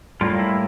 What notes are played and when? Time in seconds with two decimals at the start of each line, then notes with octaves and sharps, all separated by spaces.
0.21 A2 G3 A#3 F4
0.39 E4